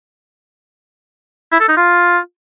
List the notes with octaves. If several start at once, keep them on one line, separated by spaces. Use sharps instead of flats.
E4
A4
D#4
F4